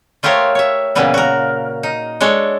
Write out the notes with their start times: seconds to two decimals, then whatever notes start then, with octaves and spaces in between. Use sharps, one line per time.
0.23 A3 F4 G4 A#4 C5 C#5
0.55 C#5 E5
0.95 A#2 C#3 E3 G3 B3
1.14 F#4 A#4
1.83 D#4
2.21 G#3 D4 A4 C#5